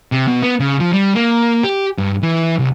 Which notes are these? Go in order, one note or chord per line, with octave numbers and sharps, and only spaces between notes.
C3
B2
B3
C#3
F3
G3
A#3
G4
G2
E3
C2